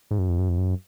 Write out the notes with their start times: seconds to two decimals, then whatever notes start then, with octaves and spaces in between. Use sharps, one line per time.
0.11 G#2
0.19 F#2
0.29 F2
0.39 F#2
0.49 F2
0.58 F#2